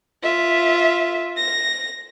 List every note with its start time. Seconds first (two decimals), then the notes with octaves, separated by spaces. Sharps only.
0.23 F4 E5
1.37 A#6